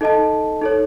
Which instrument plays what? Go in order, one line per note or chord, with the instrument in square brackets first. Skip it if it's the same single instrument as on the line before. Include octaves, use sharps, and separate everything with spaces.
[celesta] D#4 A4 D#5 A5
D#4 A4 C#5